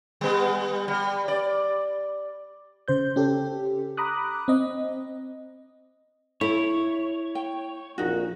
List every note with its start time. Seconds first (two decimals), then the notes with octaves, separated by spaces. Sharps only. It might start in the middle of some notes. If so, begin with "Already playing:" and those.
0.21 G3 B3
0.88 G3
1.28 D5
2.88 C#3 C5 G6
3.16 C#4 G4 A4
3.97 A#5 B5 D6 D#6 F#6
4.48 C4 D#5
6.41 E4 A4 C#5
7.35 G5
7.98 A#1 F2 A#2 D#4 F#4